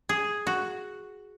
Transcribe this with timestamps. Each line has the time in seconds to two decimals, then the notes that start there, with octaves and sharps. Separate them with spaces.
0.09 G#4
0.47 F#4